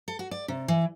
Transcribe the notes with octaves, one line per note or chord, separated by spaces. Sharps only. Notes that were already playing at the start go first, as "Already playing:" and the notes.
A4
F#4
D5
C3
E3